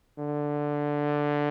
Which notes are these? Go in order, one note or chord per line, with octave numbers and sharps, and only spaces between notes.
D3